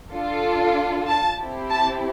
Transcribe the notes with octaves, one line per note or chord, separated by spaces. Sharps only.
D4 F4 A4
A5
C4 E4 G4
A5